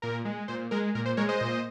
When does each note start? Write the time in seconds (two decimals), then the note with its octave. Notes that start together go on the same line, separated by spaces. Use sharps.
0.02 A#2 A#4
0.25 G#3
0.48 A#2 C5
0.71 G#3 A#4
0.95 A#2 A#4
1.06 C5
1.17 G#3 A#4 C#5
1.29 C5 D#5
1.41 A#2